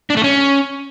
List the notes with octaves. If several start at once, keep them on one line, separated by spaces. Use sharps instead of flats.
D4
A3
C#4